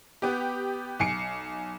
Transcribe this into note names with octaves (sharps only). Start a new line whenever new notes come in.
B3 G4
B1 G#5 C7 C#7